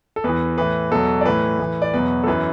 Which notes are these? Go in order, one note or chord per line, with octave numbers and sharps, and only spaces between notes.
A4
E2 E3 B4
A2 E3 B4
E2 B2 F#3 A4
D5
A2 E3 B4
A2 E3
D5
E2 B2 F#3 B4
A4
F#2 E3 B4